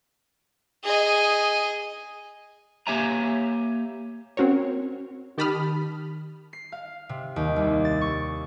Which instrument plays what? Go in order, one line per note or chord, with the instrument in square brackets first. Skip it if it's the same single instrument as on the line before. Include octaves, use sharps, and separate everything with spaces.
[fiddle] G#4 D#5
[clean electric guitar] A#3 G4 C#5 E5 G#5 A#5
[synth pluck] C4 C#4 F#4 A#4 C#5
D#3 G4 A5 B5 D#6 F6
[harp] C7
F5
C3
D#2
C2
A6
C#6